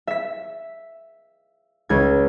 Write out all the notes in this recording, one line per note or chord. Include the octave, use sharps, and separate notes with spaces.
E5 B6
C#2 G#6